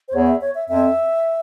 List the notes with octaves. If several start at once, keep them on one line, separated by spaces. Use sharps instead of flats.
C5
E2 C#5
E5
C#5
E5
F2 E5